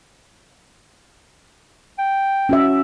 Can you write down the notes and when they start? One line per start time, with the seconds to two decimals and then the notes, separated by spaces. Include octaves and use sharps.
1.99 G5
2.49 C#4 F#4 E5